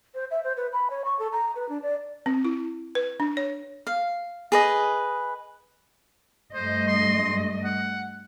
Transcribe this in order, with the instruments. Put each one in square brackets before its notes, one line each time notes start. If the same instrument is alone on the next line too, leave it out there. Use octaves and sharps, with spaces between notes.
[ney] C5
E5
C5
B4
B5
C#5
C#6
A4
A#5
B4
D4
D5
[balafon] C4
E4
B4
D4
C#5
[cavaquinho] F5
G#4 B4 D#5
[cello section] G2 A3 D#5 [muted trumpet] C5
[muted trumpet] C6
F#5